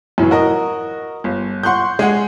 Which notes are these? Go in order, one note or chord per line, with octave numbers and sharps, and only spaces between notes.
F#2 A2 E3 F#3
F#4 A#4 D#5
G1
F#5 C6 C#6 F#6 G6
G#3 G#4 F#5